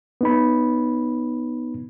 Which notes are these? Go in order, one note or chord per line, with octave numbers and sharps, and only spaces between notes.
B3 D#4 B5